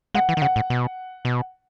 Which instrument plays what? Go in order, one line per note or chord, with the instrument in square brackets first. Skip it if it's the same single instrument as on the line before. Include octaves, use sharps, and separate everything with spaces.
[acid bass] G#3 [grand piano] F#5
[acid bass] E3
D#3
[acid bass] C#3 [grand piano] F#5
[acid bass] A2
B2
B2